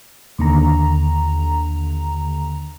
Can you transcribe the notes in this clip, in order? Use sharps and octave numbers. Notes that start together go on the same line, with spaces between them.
D#2 D3 A#5